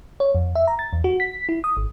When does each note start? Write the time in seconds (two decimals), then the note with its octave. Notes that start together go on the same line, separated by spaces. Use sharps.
0.20 C#5
0.35 F2
0.55 E5
0.67 A#5
0.79 A6
0.93 E2
1.04 F#4
1.20 B6
1.49 E4
1.64 D#6
1.77 G#1